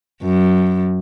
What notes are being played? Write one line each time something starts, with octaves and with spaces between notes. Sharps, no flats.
F#2